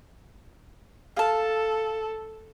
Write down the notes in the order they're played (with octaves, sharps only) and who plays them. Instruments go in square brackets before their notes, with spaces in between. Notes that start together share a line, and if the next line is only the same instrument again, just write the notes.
[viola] A4 [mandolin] F5 A5